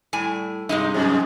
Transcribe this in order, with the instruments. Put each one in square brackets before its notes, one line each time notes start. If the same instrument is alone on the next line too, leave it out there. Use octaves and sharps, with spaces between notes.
[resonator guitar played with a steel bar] A2 G3 G#5
[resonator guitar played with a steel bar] G2 C3 G#3 [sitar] D#4
[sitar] F2 G#2